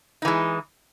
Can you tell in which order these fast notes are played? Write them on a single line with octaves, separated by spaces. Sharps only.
D#4 E3 G#3